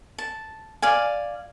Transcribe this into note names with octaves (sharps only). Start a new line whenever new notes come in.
A5
D5 F5 G#5